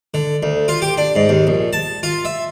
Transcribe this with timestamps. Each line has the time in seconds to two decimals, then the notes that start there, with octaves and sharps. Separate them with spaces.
0.14 D3
0.43 D2
0.68 F4
0.82 G4
0.97 D4
1.16 G#2
1.29 D#2
1.47 A#1
1.73 A5
2.03 F4
2.25 E5